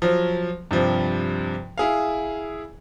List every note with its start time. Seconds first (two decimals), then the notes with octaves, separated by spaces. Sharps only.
0.02 F3 F#3
0.71 G2 C3 F3
1.78 E4 G#4 F5